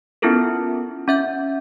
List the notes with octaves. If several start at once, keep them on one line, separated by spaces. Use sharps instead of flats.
B3 C#4 E4 F4 A4 A#4
C#4 E5 G6